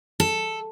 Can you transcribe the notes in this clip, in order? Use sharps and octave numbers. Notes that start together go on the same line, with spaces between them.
A4